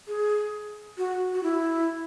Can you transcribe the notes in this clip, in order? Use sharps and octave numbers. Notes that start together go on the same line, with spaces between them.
G#4
F#4
F#4
E4